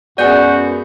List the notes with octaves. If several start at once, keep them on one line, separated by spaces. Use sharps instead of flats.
F#2 G#3 B3 F#4 G#4 D5 G6